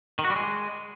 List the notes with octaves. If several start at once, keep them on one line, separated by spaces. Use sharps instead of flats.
D#3
F#4
G3
G#3